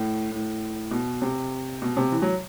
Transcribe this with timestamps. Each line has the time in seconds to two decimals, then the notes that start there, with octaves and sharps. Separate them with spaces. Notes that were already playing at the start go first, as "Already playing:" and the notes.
Already playing: A2
0.31 A2
0.91 B2
1.22 C3
1.82 B2
1.97 C3
2.12 E3
2.22 F#3